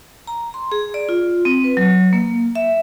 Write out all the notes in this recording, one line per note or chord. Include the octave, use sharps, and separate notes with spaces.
A#5
C6
G#4
D5
F4
C4
B4
F#3
A#3
E5